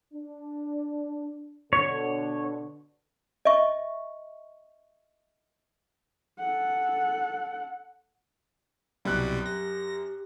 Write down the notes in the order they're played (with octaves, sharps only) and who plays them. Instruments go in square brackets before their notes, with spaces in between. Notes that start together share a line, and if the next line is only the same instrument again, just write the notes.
[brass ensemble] D4
[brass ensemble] B2 D3 [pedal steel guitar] C#5
[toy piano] D#5 E5 C#6
[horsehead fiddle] A4 F#5
[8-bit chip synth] C2 B2 G3 [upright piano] F#2 F#6
[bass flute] G4 [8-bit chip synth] A#6